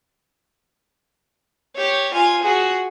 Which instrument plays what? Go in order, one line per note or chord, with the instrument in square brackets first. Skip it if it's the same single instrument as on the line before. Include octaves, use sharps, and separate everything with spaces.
[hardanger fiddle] G4 C#5
F4 G#5
F#4 G#4